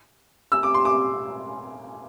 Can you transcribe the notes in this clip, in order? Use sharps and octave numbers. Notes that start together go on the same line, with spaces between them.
E6
D6
C6
D6